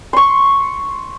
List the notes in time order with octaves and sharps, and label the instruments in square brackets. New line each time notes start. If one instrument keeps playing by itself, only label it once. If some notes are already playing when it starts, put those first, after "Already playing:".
[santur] C6 C#6